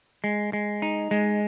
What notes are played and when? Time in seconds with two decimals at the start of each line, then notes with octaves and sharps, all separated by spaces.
0.24 G#3
0.53 G#3
0.82 D#4
1.11 G#3